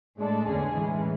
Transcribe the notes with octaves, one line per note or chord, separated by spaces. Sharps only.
A2 G#3 D4 A4
E2 D3 G#3 C#4 G#4
A2 E3 G#3 C#4